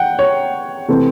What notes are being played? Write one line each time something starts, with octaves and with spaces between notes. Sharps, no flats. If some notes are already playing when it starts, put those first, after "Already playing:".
Already playing: F#5 G5
C#5
C3 E3 A3 C4